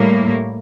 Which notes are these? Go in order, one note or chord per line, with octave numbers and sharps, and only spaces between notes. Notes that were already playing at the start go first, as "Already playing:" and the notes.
Already playing: A2 G3 A#3